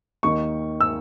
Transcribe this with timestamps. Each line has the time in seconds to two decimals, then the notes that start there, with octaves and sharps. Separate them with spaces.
0.23 D#2 D#3 C#6
0.81 E6